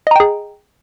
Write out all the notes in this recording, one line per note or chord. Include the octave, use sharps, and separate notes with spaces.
G#4 D#5 G5 A#5